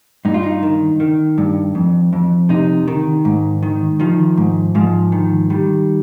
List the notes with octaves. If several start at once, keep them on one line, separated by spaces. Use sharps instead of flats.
G2 D#4
F4
D#4
D#3
D#3
G2
F2
F2
C3 D#4
D#3
G#2
D#3
D#3 F3
G#2
G#2 F3
D#3
D#3 G3